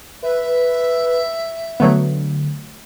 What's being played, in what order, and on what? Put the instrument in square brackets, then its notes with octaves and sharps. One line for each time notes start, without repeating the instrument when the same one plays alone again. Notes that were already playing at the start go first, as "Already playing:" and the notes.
[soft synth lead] B4 [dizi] E5
[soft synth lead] D3 [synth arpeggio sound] F#3 A3 B3